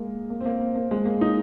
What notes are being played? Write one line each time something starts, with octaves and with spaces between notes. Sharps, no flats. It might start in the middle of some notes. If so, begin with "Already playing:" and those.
Already playing: G#3 A#3
A#3
C4
A#3
A#3
G#3
A#3
D#4